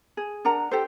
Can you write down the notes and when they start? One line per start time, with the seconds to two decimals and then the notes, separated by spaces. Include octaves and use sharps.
0.17 G#4
0.45 D4 A#4 F#5 A#5
0.71 G4 A4 C5